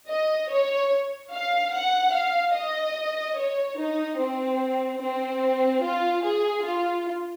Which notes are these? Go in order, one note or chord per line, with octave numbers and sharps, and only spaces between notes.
D#5
C#5
F5
F#5
F5
D#5
C#5
D#4
C4
C4
F4
G#4
F4